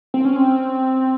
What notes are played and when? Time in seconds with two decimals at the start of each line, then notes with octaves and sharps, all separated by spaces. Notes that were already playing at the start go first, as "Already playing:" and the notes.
0.14 C4
0.25 C#4
0.36 C4